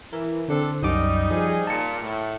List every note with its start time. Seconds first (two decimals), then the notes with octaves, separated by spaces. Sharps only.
0.13 E3 A#4
0.48 D3 C4 D4 A4
0.82 C2 F#2 G3 D#4 D6
1.31 F3 G#4
1.67 A#2 A5 C#7
2.01 A2